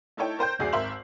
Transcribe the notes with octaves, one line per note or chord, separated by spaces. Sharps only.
A3 D#4 E4 A4 C#5 G5
A#4 C5 G5 G6
F#1 D2 G#4 D5 C7
G#1 A#4 E5 C6 F#7